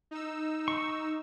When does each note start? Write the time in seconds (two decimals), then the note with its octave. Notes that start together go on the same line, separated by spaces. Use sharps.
0.11 D#4 E6
0.68 C#6